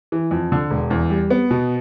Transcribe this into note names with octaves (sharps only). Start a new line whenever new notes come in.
E3
F2
D3
E1
E2
G3
B3
B2